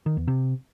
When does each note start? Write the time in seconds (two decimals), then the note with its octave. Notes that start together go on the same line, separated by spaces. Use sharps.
0.06 D#3
0.17 E2
0.28 C3